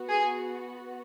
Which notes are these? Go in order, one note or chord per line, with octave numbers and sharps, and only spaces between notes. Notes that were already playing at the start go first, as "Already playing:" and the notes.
Already playing: B3 F#4
G#4 G#5